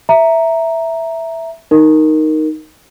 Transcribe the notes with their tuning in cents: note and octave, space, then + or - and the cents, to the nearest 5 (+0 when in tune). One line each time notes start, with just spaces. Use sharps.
E5 +0 A#5 +0
D#4 +0 A#4 +0